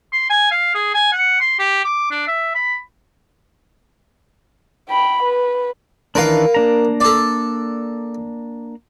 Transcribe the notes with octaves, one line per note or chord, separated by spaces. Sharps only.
C6
G#5
F5
G#4
G#5
F#5
C6
G4
D6
D4
E5
B5
G5 B5
B4
D#3 E3 D4 A#4 B4 F5
A#3 D4 A#5
A4 D5